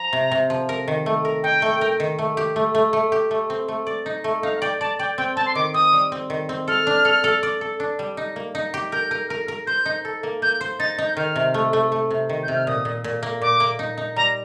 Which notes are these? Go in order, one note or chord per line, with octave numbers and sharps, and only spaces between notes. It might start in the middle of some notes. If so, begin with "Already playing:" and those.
Already playing: F3 A#5
C3
C3
F3
A#4
D#3
A3
A#4
D#4 G5
A3
A#4
D#3
A3
G4
A3
A3
A3
G4
A3
C4
A3
D5
D#4
A3
D#4 F5
F5
D5 G5
D5 A5
D5 G5
C4 G5
C4 A5
C6
D#3 D6
C4 D#6
G3
C4
D#3
C4
A4 F6
D4
A4
A4
D5
A4
D4
G3
D#4
A#3
D#4
G4
A#4 G6
A#4
A#4
A#4
C5 G6
D#4
A4
A#3
A#3 G6
C5
D#4 A6
D#4
G6
D#3 F6
C3
A3
A3
A3
C3
D#3
C3 G6
F6
A#2 D#6
A#2
A#2
A#3
A#2 D6
A#3
D#4
D#4
G3 A#5